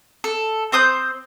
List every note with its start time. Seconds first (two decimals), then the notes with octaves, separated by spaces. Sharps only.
0.24 A4
0.72 C4 C5 D#6 G6